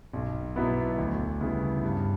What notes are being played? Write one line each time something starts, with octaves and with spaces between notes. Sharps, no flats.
B1
B2 F#3 B3 E4
D2
C#3 G3 B3 E4
G2